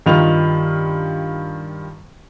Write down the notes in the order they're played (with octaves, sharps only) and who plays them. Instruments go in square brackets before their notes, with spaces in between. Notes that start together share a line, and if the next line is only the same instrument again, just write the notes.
[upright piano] G2 D#3 F4 F7